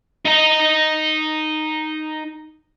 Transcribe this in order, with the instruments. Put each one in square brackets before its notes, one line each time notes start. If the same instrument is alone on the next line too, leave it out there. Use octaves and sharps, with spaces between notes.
[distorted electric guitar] D#4 A#5